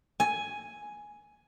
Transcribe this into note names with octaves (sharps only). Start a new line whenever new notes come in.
G#5